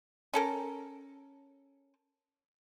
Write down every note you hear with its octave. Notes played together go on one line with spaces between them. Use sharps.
C#4 A4 A#4